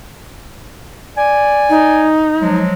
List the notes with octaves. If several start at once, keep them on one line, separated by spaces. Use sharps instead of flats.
D5 G#5
D#4
F3 F#3 G#3